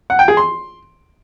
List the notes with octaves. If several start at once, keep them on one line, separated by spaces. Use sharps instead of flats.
F#5
G5
G#4
C6